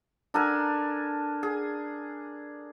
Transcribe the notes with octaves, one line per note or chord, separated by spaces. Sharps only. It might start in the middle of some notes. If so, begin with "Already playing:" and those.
D4 A4 A#4 G#5
G#4